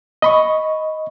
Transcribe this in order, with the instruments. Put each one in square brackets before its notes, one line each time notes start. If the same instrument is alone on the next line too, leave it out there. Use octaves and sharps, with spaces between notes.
[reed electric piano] D#5 B5 C#6